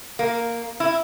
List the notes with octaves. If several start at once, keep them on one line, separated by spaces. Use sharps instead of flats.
A#3
E4